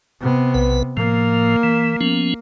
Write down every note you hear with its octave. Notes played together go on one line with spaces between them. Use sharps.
C3 B3
B1 B4
A2 F3 A#3
E3
F3 B3 C#4